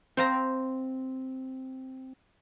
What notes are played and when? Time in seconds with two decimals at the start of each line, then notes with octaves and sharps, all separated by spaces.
0.17 C4 C5 F5 A#5